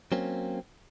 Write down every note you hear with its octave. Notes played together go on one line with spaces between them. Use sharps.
F#3 A#3 C4 C#4